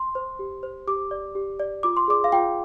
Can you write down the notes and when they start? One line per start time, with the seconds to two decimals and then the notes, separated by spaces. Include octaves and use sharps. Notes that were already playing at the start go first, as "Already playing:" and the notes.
Already playing: C6
0.15 C5
0.39 G4
0.63 C5
0.87 G4 D6
1.11 D5
1.35 G4
1.60 D5
1.83 F4 D6
1.97 C6
2.08 G#4 D5 D6
2.24 F5
2.32 F4 G5